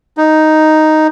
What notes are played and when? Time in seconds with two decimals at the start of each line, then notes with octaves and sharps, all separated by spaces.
0.18 D#4